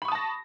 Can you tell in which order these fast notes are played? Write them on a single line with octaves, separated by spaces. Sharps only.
B5 C#6 D#6 A5 A#6